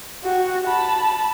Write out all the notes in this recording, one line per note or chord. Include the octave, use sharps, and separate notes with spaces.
F#4 G4
A5 B5